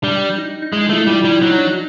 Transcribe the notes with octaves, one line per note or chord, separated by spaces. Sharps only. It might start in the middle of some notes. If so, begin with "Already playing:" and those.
G3 D4
D#4
D#4
G#3 E4
A3 F4
G3 F4
G3 E4
F#3 E4
D#4
D4
D#4